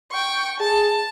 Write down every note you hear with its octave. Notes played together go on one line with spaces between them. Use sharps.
G5 C#6
G#4 A5